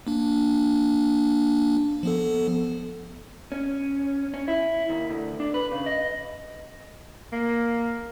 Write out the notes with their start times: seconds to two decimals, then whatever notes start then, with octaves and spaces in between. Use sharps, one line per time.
0.07 A#3 D4
2.03 F3 B3 A4
3.52 C#4
4.34 C#4
4.48 E4
4.90 D#2
5.10 D2
5.40 D4
5.54 B4
5.71 C#3
5.86 D#5
7.33 A#3